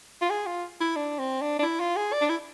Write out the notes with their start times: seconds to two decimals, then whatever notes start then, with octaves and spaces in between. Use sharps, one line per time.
0.22 F4
0.30 G#4
0.46 F4
0.80 E4
0.96 D4
1.19 C4
1.41 D4
1.59 D4
1.63 E4
1.80 F4
1.96 G#4
2.13 D5
2.21 D4
2.30 E4